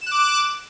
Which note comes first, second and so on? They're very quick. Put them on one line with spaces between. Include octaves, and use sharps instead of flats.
E7 F#6 D6